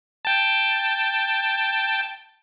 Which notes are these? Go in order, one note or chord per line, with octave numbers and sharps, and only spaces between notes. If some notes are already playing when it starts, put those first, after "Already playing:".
G5 A5